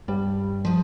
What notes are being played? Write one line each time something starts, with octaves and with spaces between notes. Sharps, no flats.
G2 G3
F3 D#4